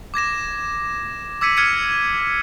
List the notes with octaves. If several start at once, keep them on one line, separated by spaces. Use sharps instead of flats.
D6 G#6 A#6 E7
D6 E6 G#6 B6 C#7 D#7
F6 G#6 C#7 D#7 E7